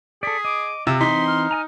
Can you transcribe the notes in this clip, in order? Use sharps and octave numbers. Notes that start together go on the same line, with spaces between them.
G#4 A4 D5 B6
D#5 D6
C3 F4 E5
E3 C4 D#4 C6 B6
F6
D#5 G#5 A#5